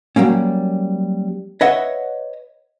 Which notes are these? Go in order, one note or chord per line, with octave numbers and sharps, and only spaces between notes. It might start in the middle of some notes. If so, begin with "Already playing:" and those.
F#3 G3 A#3 C#4
B4 C#5 D#5 E5 F#5